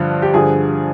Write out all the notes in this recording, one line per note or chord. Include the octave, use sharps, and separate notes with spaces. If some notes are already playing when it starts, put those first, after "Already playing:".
Already playing: G2 D3 F3
G4
G2 D3 F3 G#4